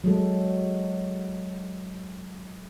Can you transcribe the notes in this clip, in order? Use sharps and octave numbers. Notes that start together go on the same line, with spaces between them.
F#3 G#3 A4